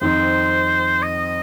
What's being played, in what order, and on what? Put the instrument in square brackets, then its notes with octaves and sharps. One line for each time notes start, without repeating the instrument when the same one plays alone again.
[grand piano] F2 D#3 C4 D#4 [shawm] C5
[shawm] D#5